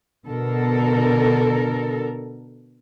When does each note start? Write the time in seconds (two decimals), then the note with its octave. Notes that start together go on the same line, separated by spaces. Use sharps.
0.27 B2 D3 A4 A#4